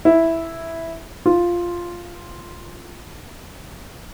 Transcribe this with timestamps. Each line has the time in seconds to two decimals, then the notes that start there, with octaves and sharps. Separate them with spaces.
0.05 E4
1.26 F4